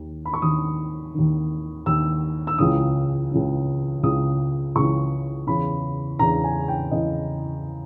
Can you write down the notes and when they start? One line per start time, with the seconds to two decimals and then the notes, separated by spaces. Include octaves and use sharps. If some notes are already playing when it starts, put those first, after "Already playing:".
Already playing: D#2 D#3
0.25 B5
0.34 C#6
0.42 D#2 D#3 D#6
1.14 D#2 D#3
1.86 D#2 D#3 E6
2.47 E6
2.58 C#2 C#3 E3 D#6
3.31 C#2 C#3 E3
4.03 C#2 C#3 E3 D#6
4.76 C#2 C#3 E3 C#6
5.47 E2 C#3 E3 B5
6.19 E2 C#3 E3 A#5
6.44 G#5
6.68 G5
6.91 E2 C#3 E3 D#5